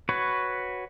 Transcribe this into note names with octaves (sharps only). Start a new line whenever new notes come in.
F#4 B4 C#5